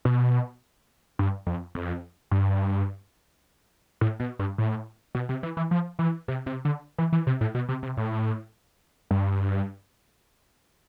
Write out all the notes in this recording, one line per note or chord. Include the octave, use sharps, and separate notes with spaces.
B2
G2
F2
F2
G2
A2
B2
G2
A2
B2
C3
E3
E3
F3
E3
C3
C3
D3
E3
E3
C3
A2
B2
C3
C3
A2
G2